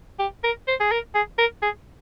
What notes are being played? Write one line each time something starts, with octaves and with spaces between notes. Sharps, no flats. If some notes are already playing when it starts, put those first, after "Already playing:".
G4
A#4
C5
G#4
A#4
G#4
A#4
G#4